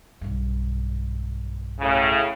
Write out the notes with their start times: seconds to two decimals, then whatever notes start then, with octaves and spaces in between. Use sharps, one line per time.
0.21 B1 G2
1.80 A2 C#3